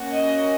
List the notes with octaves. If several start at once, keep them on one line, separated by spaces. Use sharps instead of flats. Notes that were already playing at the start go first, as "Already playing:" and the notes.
Already playing: A#3 C#4 F#4
D#5